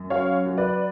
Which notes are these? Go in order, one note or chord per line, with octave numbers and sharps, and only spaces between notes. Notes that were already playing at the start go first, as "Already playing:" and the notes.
Already playing: F#2
F#3 C#5 F5
F#3
B4 D5